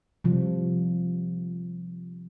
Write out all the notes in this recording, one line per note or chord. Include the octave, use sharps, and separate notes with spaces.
C3 F3 G3